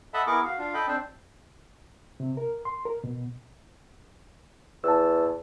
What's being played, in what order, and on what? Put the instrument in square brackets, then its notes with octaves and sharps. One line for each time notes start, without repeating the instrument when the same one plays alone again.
[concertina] A4 D#5 E5 F#5 A5 B5
B3 E4 G#4 A#4 C#6 D6
F#4 F5
D4 F4 F5
A4 D#5 G5 B5
C4 D4 C5
[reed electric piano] C3
A#4
C6
A#4
B2
[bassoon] E2 [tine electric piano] A5 E6